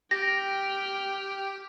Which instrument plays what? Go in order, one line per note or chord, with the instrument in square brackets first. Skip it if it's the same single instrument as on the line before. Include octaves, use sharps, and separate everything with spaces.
[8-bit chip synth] G4 [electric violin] G5 F6 [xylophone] A#6